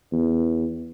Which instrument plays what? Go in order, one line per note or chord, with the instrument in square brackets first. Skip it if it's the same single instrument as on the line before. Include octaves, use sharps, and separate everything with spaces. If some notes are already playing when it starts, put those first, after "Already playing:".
[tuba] E2